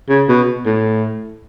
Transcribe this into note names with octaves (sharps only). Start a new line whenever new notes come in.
C#3
B2
A2